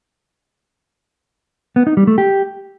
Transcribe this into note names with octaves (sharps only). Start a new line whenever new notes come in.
B3
D#4
G3
A3
G4